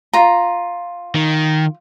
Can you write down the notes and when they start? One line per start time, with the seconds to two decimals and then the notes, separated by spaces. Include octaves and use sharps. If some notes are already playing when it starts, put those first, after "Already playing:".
0.13 F4 A#5
1.15 D#3